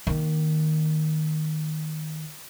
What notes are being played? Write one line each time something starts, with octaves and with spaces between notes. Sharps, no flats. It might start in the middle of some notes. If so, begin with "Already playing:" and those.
D#3 A#3